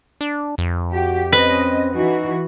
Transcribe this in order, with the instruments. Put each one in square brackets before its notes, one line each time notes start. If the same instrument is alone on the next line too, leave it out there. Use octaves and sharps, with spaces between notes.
[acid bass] D4
F2
[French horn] F#4 [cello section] G4
[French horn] C4 [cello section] C#4 D#5 [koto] B4
[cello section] E3 F#4 [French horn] D#4